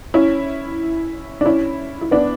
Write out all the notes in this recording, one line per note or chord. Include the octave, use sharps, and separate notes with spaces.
C#4 E4
D4
C#4 E4
E4
B3 D4